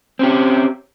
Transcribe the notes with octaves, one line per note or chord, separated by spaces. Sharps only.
C4 C#4 G4